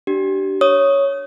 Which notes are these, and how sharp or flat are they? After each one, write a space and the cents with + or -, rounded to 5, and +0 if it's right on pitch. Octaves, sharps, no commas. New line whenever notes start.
D4 +0 G4 -30
C#5 +0 D#6 +0